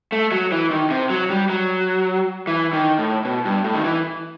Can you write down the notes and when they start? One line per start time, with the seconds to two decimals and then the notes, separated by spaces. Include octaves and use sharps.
0.12 A3
0.32 F#3
0.52 E3
0.71 D#3
0.90 C3
1.10 F#3
1.30 G3
1.50 F#3
2.47 E3
2.73 D#3
2.99 A2
3.25 B2
3.45 G2
3.64 A2
3.74 D#3
3.84 E3